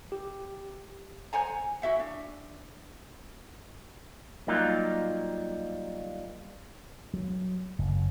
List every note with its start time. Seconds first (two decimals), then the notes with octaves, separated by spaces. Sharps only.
0.12 G4
1.33 C5 F#5 G#5 A#5
1.82 E4 F#4 E5 F#5
2.00 D4
4.47 F#3 G3 A#3 D#4 F4 G4
7.14 F#3
7.79 F#1